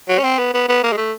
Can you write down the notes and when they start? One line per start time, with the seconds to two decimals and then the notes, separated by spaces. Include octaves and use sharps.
0.09 F#3
0.19 C#4
0.24 C4
0.39 B3
0.54 B3
0.68 B3
0.83 A#3
0.93 G#3
0.97 A3